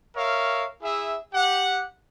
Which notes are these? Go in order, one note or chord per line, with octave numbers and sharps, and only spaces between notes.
A#4 C#5 E5 F5
E4 G#4 E5
G4 F#5